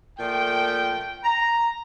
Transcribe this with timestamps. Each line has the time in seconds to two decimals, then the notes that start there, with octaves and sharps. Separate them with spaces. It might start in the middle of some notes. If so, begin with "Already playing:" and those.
0.19 A#2 F3 A3 G5
1.25 A#5